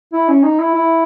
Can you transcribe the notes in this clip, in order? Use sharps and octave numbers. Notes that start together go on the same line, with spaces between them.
E4
C#4
D#4
E4
E4